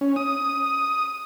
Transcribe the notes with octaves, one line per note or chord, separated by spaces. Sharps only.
C#4
D#6